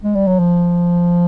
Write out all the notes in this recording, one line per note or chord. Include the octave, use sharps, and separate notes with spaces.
G#3
G3
F#3
F3